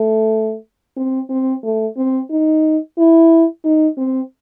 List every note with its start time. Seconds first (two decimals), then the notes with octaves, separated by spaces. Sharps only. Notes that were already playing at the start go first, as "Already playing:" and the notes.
Already playing: A3
0.97 C4
1.30 C4
1.64 A3
1.97 C4
2.31 D#4
2.98 E4
3.65 D#4
3.98 C4